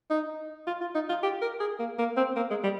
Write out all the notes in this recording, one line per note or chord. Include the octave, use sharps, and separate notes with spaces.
D#4
F4
F4
D#4
F4
G4
A#4
G#4
A#3
A#3
C4
A#3
G#3
G3